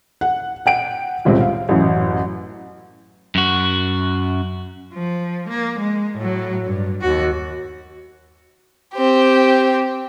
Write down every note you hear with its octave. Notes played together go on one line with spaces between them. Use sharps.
F#5
F#5 G5 D7
G1 C#2 C3
F5
A1 F#2
F#2 F#4
F3
A#3
G#3
A2 F#3
G2
D#2 F#4
C4 G4